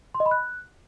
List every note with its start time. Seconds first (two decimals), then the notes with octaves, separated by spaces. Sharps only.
0.15 C6
0.20 D#5
0.26 B5
0.31 F#6